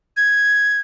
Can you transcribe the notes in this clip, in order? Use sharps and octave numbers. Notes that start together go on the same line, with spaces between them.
G#6